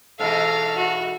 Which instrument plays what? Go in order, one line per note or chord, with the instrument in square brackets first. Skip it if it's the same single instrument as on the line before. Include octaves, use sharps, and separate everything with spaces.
[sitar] G#2 B2 E3 [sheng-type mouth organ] A4 E6 F6 [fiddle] F5 A#5
[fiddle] F#4